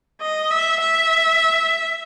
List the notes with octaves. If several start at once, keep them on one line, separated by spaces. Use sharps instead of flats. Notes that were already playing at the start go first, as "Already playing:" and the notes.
D#5
E5
E5